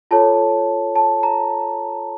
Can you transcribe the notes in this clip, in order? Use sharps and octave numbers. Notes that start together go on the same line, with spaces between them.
F4 A4 C#5 A5
A5
A#5